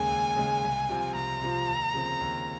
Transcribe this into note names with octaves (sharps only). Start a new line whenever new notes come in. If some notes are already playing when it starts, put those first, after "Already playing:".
Already playing: D#2 C#3 G#3 G#5
D#2
C#3 G#3
C2
C3 F3 C4 F4
C2 A#5
C3 F3 C4 F4
D#2
C#3 F3 C4
D#2